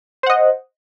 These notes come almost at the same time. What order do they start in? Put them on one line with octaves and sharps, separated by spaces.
C5 F#5 D#5